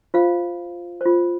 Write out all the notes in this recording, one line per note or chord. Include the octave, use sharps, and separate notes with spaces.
F4 C5 F5
F4 C5